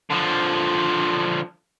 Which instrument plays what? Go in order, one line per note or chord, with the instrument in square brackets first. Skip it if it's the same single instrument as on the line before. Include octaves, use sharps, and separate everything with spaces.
[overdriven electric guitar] D3 F3